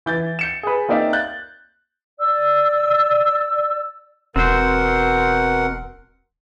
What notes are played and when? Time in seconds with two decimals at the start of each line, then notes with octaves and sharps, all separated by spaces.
0.06 E3 G6 A6
0.39 G6 C#7 E7
0.63 G#4 B4
0.89 A#3 C4 D#4 D5 E5 F5
1.13 F#6 G6 A6
2.19 D5 E6
4.36 E1 B2 C4 A#4 C5 F#5